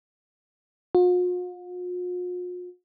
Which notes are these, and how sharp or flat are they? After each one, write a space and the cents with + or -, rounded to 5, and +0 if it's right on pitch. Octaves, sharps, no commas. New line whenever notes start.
F4 +45